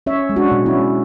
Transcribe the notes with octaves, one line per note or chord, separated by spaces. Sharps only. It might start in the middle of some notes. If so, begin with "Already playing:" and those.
C#4 C#5 E5
G#3
D4 F#4
B2
C#4 E4
G#3